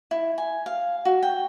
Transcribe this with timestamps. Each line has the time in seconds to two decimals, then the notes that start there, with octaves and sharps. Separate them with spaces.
0.11 E4
0.38 G#5
0.66 F5
1.05 F#4
1.23 G5